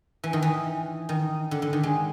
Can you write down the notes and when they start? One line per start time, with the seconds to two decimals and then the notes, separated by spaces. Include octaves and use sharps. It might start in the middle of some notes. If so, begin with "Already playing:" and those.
0.23 E3
0.33 D#3
0.42 E3
1.09 D#3
1.51 D3
1.62 D3
1.73 D#3
1.83 G#3